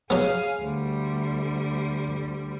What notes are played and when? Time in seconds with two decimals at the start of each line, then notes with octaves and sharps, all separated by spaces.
0.10 F#3 B3 G#4 F5
0.61 D2 G3